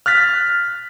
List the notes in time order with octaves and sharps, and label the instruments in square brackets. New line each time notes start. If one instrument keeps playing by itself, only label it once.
[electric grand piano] F6 F#6 A6 B6